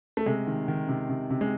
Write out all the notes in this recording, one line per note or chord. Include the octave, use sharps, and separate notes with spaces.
A3
C3 G#3
D#3
D#3
C3
C3
C3
G#3